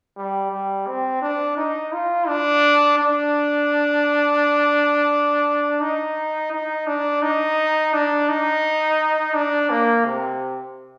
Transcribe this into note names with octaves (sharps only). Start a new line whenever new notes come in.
G3
G3
C4
D4
D#4
F4
D4
D4
D#4
D#4
D4
D#4
D4
D#4
D4
A#3
C3